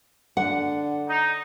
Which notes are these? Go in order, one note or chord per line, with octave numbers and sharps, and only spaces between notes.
D3 F#5
D#4